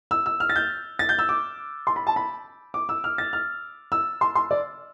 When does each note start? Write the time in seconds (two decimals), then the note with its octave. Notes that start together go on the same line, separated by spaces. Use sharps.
0.11 E6
0.26 E6
0.40 F6
0.49 A6
0.56 G6
0.99 A6
1.09 G6
1.19 E6
1.29 D6
1.87 C6
1.96 B5
2.07 A5
2.16 B5
2.74 D6
2.89 E6
3.04 F6
3.18 A6
3.33 F6
3.92 E6
4.21 C6
4.35 C6
4.51 D5